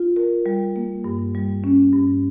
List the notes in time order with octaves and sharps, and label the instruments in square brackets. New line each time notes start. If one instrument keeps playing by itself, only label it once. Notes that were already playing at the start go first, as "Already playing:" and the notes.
Already playing: [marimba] F4
A#4
G3
A#3
G2
G3
C#4
G2